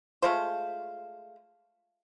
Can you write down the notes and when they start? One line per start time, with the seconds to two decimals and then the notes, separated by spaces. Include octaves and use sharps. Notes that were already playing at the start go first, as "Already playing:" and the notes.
0.22 G#3 A3 F4 C5